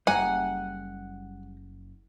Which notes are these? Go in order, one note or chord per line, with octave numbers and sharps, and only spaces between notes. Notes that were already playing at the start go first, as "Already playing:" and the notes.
F#1 G3 F#5 G#5 A#5